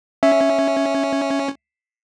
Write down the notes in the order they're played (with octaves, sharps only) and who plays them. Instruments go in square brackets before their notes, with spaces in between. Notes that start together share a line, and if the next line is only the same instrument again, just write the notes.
[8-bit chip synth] C#4 [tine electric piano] E5